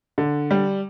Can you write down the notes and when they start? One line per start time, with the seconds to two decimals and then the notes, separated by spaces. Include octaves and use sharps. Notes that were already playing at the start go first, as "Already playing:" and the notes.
0.18 D3
0.51 G3